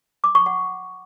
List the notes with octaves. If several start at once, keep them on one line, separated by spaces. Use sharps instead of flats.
D6
C#6
F#5